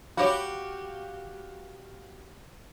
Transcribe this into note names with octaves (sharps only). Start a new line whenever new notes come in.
F#4 G4 C#5 F5 B5